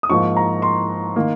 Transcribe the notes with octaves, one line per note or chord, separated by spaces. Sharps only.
D#6
G#2 F3 A#3 C#6
A#5
C6
D#3 A#3